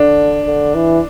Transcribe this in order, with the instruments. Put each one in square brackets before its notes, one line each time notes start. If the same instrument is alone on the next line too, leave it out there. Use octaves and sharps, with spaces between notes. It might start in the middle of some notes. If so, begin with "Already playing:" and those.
Already playing: [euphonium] D3 [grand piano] D4
[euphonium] D3
E3